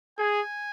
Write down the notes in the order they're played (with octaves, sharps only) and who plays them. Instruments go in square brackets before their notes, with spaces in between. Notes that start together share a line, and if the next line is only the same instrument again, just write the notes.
[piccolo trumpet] G#4 [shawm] G#5